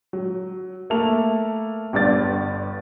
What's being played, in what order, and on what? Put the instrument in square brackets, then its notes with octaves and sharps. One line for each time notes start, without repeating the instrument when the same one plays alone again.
[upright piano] F#3
A3 A#3 A4 F7
G1 G2 D5 A6